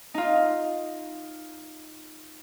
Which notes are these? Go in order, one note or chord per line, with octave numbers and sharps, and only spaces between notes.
D#4 F4